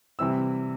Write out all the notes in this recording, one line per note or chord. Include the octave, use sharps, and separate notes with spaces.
C3 E3 G3 C4 E4 E6